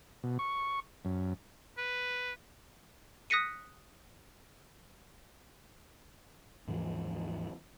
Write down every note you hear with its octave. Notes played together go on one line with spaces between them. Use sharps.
B2
C#6
F#2
B4
D#6 F#6 A#6 B6 C#7 D#7
D#2 G#2 E3 F3